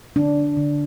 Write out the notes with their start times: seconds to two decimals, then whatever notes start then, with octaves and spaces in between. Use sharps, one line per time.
0.16 D3 D4
0.57 D3